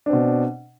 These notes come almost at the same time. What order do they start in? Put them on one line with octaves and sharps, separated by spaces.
D4 C4 B2